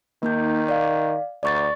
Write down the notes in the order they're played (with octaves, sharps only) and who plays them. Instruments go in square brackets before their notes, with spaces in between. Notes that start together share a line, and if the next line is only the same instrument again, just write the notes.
[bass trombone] D#3 [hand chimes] A#3 D#4 G6
[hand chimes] D5 F5
[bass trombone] D2 [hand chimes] D5 C#6 A6